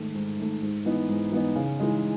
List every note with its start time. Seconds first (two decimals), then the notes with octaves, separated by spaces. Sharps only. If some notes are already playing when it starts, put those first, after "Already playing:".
Already playing: G#2 D#3 A3
0.14 G#2
0.38 D#3 A3
0.62 G#2
0.85 E3 B3 D#4
1.09 G#2
1.32 E3 B3 D#4
1.56 C#3
1.79 E3 G#3 D#4